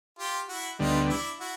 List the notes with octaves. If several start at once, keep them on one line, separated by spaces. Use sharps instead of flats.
F4 G4
E4 F#4
D2 D3 G3 B3 D#4 F4
D4 E4
E4 F#4